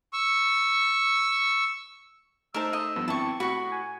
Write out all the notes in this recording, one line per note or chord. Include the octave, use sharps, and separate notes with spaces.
C#6 E6
A3 D#4 A#4 C5 A5 E6
D#5
G2 F3 B3
G#1 C4 E4 A5 C#6
A2 F#4 B5 C#6
G#5